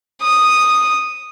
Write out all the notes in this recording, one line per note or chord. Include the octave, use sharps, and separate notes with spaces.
D#6